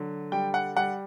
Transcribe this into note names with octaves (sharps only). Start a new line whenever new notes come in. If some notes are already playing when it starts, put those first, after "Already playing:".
Already playing: D3 F#3
G3 G5
F#5
G3 F#5